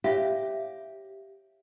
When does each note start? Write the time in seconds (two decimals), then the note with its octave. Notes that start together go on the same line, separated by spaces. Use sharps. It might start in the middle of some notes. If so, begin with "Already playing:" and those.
0.04 G4 C#5 E5 F5